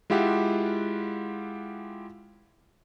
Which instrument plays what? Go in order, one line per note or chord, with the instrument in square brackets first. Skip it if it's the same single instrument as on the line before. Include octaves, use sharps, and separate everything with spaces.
[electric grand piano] G#3 E4 F4 G4 E5 F#5